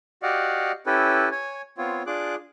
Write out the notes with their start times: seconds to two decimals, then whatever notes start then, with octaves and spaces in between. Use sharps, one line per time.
0.23 F#4 G4 D5 D#5 F5 F#5
0.86 C#4 E4 G4 A4 B4
1.31 C#5 G#5
1.78 B3 C4 F4 C#5
2.07 D4 F4 G#4 D6 F#6